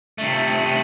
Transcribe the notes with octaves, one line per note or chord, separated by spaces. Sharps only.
C3 A3